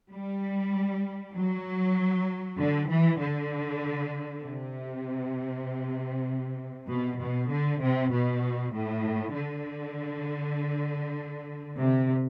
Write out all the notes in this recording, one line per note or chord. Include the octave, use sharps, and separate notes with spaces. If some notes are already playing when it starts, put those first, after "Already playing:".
G3
F#3
D3
E3
D3
C3
B2
B2
D3
C3
B2
A2
D3
C3